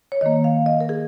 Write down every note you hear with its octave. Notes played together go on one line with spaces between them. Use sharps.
C#5
D#3 A#3 D#5
F5
D#5
A#4
G#4